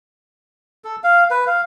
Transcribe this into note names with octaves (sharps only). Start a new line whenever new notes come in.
A4
F5
B4
F5